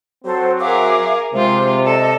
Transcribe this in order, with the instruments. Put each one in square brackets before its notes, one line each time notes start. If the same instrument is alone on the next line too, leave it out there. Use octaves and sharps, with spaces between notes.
[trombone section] F#3 C4 F#4 [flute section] A4 C5
[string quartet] G#4 A#4 [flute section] E5 F5 D6
[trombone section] C3 [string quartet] G#3 F4 [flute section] C5
[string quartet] A4 [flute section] D5 D#5